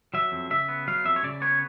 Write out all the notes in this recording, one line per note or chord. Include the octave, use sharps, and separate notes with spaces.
F#3 E5
F2
C#3 E5
B3
F#3 F5
F2 E5
C#5
C#3 D5
B3 C#5